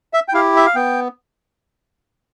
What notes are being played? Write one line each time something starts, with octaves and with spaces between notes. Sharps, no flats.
E5
G5
E4 G4 F5
E5
F5
B3 G5